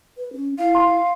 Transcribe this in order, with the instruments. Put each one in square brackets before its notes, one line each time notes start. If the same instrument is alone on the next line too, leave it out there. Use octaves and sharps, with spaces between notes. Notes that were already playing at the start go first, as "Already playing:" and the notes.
[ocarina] B4
C#4
[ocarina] E4 [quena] F5
[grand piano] C6